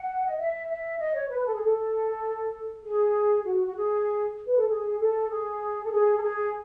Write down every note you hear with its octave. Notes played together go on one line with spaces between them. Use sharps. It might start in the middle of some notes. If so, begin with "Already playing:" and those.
Already playing: F#5
D#5
E5
E5
D#5
C#5
B4
A4
G#4
A4
G#4
F#4
F#4
G#4
B4
A4
G#4
A4
G#4
A4
G#4
A4
G#4